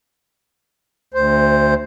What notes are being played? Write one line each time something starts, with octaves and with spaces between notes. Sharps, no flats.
D2 C5